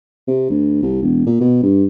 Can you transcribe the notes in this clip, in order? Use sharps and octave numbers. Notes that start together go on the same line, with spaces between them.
C3
D2
C2
E1
A#2
B2
G2